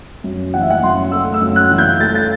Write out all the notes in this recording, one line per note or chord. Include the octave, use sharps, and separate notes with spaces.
F#2
E3 F#5
E5
F#5
F#2 C6
A3 E6
E6
F#2
F#6
E3
G6
A3 A6
A6